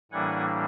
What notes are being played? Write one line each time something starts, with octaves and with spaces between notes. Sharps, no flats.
A2 E3 G3 A#3 D4 F#5 G#5